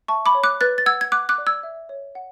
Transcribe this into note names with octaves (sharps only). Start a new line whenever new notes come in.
E5 A5 C#6
B5 D6
C#5
D6 F#6
B4 F#6 A6
A6
F#5 E6 G#6
G#6
F#5 D6 F#6
D6 F#6
D5
E6 G#6
E5
C#5
F#5